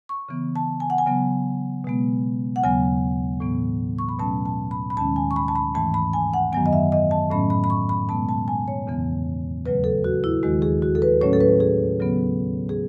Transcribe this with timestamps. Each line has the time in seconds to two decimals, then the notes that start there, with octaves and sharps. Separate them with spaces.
0.09 C#6
0.29 C#3 E3 B3
0.56 A5
0.80 G#5
0.90 F#5
0.98 G#5
1.07 C#3 F#3 B3
1.84 B2 G#3 B3
2.56 F#5
2.64 D#2 C#3 F#3 B3 G#5
3.40 A2 E3 B3
3.99 C#6
4.09 B5
4.19 B2 F#3 A3 C#4 A5
4.46 A5
4.71 B5
4.90 B5
4.97 D#2 D#3 G#3 C#4 A5
5.16 G#5
5.31 C#6
5.36 B5
5.48 A5
5.56 B5
5.74 G#2 E3 A3 A5
5.94 B5
6.13 G#5
6.34 F#5
6.52 F#2 D#3 F#3 B3 G#5
6.66 D#5
6.73 E5
6.92 D#5
7.11 A5
7.30 A2 F#3 A3 C#4 B5
7.50 B5
7.64 B5
7.70 C#6
7.89 B5
8.09 B2 G#3 B3 A5
8.29 A5
8.48 G#5
8.68 C#5
8.87 E2 C#3 E3 B3
9.65 D#2 C#3 F#3 A3 B4
9.84 A4
10.04 F#4
10.24 E4
10.43 D#2 D#3 G#3 F#4
10.62 G#4
10.82 F#4
10.95 A4
11.02 B4
11.21 A2 F#3 A3 C#4 C#5
11.33 A4
11.41 B4
11.60 G#4
12.00 C#3 F#3 B3
12.69 G#4